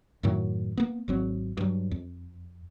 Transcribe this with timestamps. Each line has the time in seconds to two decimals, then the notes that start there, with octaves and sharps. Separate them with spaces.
0.23 F#2 A2 D#3 F#3
0.77 A#3 B3
1.08 G#1 F#3 C4
1.57 G2 F#3
1.91 F2